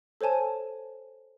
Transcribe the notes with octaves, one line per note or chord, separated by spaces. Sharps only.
A4 C5 C#5 G#5 A5